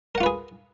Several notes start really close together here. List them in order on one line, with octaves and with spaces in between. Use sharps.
A#4 F#5 F4 B4 G#4